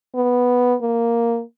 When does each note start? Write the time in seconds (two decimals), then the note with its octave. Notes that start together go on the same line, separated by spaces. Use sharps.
0.15 B3
0.82 A#3